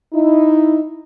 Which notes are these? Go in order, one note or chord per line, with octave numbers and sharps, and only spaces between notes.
D#4 E4